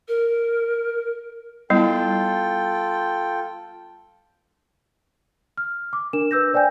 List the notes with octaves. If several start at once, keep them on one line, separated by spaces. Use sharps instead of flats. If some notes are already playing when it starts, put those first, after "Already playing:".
A#4
G3 B3 E4 F4 A4 G5
F6
D6
D4 A#4 E7
B4 E6 G6 A#6
C5 D5 G5 G#5 G6